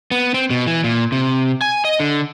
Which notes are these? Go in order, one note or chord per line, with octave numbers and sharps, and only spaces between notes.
B3
C4
B2
E3
A#2
C3
G#5
D#5
D3